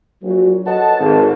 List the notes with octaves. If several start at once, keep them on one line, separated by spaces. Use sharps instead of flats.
A#1 F#3
A4 B4 C#5 D#5 F#5 A5
G#1